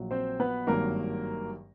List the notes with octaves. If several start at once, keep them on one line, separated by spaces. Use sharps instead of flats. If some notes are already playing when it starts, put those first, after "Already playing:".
Already playing: A#1 A#2 F#3
C4 C5
B3 B4
G#1 G2 D#3 F#3 A#3 A#4